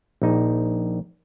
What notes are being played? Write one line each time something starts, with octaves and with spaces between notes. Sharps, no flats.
A#1 D#4